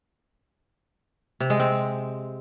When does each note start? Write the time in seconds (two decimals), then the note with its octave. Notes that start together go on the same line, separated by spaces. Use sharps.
1.40 C3
1.50 G#3
1.60 C4